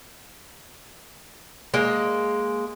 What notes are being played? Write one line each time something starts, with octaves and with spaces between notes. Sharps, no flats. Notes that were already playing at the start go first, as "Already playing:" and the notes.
G#3 A#3